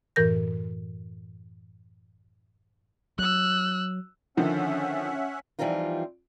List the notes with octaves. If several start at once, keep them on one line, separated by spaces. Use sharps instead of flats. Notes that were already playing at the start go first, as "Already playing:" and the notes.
F#2 A2 E3 A#4 G6 A#6
F#3 E6 F#6
D3 D#3 F3 C#4 E5 F#5
E3 F3 G3 C4 D#4 F4